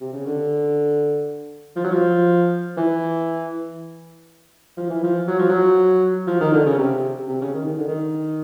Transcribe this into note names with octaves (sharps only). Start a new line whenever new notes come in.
C3
C#3
D3
F3
F#3
F3
E3
F3
E3
F3
F#3
F3
F#3
F3
D#3
D3
C#3
C3
C3
C#3
D#3
D#3
D3
D#3